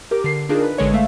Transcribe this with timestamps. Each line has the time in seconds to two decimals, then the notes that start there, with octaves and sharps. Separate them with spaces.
0.11 G4 A#4 D6
0.24 D3 C7
0.49 D4 D#4 F4 G#4 A#4
0.63 B4
0.78 A1 D3 G#3 C#5
0.93 A3 E5 F5